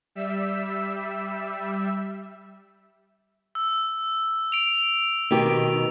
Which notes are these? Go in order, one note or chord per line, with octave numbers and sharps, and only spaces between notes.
G3 E5 E6
E6
D7 F7
B2 D#3 G4